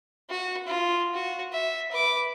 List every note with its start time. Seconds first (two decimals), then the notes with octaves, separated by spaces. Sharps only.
0.30 F#4
0.67 F4
1.14 F#4
1.53 E5
1.92 B4 D6